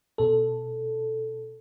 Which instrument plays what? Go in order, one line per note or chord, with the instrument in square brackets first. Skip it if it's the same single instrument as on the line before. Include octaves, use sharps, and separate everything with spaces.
[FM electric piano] B2 A4